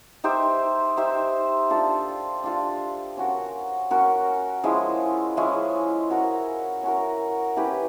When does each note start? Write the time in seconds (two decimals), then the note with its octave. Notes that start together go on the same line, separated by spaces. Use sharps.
0.24 D#4 G4 C5 E5
0.97 D#4 G4 C5 E5
1.70 D4 F4 A4
2.43 D4 F4 A4
3.17 C#4 F#4 A#4
3.90 C#4 F#4 A#4
4.64 F3 G#3 C#4 E4
5.37 F3 G#3 C#4 E4
6.10 C#4 F#4 A#4
6.83 C#4 F#4 A#4
7.56 C#4 E4 G4 B4